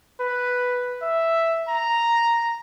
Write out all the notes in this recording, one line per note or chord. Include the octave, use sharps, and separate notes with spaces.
B4
E5
A#5